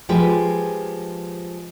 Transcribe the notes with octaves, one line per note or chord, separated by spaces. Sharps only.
F3 G#3 G4 G#4 B4